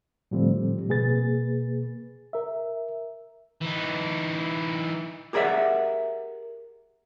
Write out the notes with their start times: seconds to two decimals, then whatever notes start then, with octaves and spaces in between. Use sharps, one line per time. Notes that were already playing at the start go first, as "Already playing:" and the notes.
0.31 A2 D3 F3 G3 A3 C4
0.89 B2 A#3 G#4 B4 A6
2.33 A#4 E5
3.62 E3 D#4
5.33 G4 G#4 A#4 D5 E5 F#5